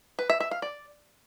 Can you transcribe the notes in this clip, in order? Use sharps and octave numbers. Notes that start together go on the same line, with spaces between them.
B4
E5
E5
F5
D5